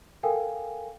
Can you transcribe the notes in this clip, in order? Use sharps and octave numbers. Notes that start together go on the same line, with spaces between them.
A4 A#4 F5 G5 G#5